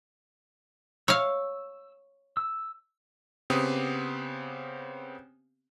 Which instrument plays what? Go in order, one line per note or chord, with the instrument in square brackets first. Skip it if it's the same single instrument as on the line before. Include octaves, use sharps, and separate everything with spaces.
[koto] C#5 F5 [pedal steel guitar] E6
[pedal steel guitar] E6
[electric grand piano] C#3 B3 C4 G4 D#6